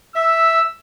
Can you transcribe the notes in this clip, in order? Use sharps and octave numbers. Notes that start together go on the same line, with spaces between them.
E5 E6